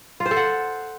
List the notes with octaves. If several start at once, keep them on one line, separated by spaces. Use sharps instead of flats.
F4
C5
A4
F#5